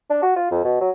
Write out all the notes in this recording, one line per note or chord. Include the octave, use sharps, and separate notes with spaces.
D4
F#4
F4
F2
B2
F#3